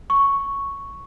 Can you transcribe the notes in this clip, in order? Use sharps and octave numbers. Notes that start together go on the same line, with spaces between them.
C#6